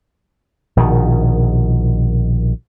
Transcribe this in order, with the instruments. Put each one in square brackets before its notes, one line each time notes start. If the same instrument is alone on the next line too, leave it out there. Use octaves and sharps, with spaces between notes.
[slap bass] A#1 B2 D#3